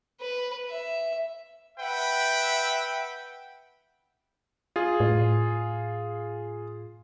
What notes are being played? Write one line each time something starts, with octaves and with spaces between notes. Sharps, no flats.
B4
E5
B4 E5 F#5 G5
F4 G#4
A2